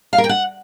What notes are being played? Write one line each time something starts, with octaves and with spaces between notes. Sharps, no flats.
F5
A#4
G5
F#5